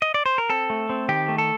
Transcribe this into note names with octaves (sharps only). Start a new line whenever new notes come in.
D#5
D5
C5
A#4
C4 A4
A3
C4
D#3 G4
A3
A4